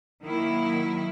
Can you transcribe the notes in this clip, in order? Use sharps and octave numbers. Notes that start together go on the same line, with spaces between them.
D#3 F#3 A#3 E4